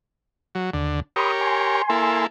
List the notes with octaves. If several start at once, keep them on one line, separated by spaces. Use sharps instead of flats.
F#3
D#2 D3
G4 A#4 C#5 B5 C6 D#6
G#5 C6
A#3 E4 A4